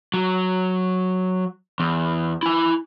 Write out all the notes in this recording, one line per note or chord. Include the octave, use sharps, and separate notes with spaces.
F#3
E2
E4 G#5